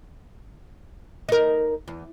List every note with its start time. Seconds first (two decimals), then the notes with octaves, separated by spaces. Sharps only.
1.29 D#4 A#4
1.88 E2